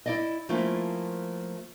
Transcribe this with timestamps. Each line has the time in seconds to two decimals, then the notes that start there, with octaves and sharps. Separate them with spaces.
0.06 E4 D5 D#5
0.49 F3 A3 A#3 C#4 E4 F4